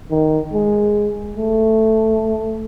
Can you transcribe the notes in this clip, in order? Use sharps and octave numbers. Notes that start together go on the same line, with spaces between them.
D#3
G#3
A3